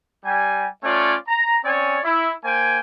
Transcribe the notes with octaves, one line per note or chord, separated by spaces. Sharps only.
G3 G#5
A3 C#4 F4 C#5 D5
A#5
C4 C#4 C#5 D5 G#5
E4
A#3 C5 G5 G#5